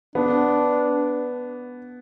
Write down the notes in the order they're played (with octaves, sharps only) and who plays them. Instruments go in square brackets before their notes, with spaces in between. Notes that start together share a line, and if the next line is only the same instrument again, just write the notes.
[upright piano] B3 [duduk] D4